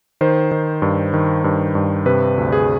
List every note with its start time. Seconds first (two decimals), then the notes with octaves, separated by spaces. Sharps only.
0.21 D#3 C5
0.52 D#3
0.82 G2
1.14 D#3
1.44 G2
1.75 G2
2.06 C3 B4
2.38 D2
2.52 G#4